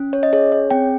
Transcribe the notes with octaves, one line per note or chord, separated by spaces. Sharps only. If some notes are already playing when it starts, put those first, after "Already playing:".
Already playing: C#4
C#5
D#5
G#4 C#5
C#5
C4 G5